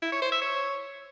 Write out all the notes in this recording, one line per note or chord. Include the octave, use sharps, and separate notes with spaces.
E4
C#5
C5
E5
C#5